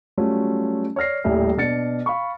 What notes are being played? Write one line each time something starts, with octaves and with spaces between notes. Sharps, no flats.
F#3 G3 A3 C#4 F4
C#5 D5 F6 A#6 C7
D#1 A2 G3 E5 G#5
B2 D4 A6 C#7
F5 B5 C#6